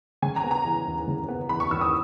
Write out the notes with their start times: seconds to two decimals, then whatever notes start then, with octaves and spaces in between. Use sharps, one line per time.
0.22 C#3 G#5
0.36 A#5
0.44 B3
0.51 A#5
0.65 E3
0.86 D#2
1.07 C#3
1.28 B3
1.49 E3 B5
1.60 C#6
1.71 D#2 E6
1.81 D#6